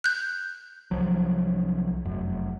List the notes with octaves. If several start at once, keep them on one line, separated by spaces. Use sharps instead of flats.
F#6 G6
C2 F3 F#3
F1 F#2